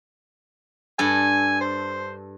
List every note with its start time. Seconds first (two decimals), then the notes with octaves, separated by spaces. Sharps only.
0.99 G2 A4 G#5
1.61 C5